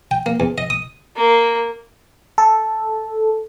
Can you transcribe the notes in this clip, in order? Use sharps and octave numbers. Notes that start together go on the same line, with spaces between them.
G5
A#3
E2
D#5
D#6
A#3
A4